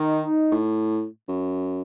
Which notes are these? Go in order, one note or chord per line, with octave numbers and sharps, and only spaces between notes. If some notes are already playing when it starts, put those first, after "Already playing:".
Already playing: D#3 D#4
A2
F#2